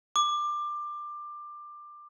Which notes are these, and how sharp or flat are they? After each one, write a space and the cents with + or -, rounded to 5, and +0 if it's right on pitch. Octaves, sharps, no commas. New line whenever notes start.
D6 +20